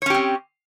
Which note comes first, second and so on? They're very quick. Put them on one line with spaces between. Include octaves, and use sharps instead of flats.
C#5 C#4 G4 C4